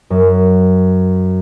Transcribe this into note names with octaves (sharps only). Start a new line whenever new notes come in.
F#2